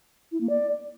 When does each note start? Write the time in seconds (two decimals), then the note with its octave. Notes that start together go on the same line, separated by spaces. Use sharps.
0.32 E4
0.41 A#3
0.49 D5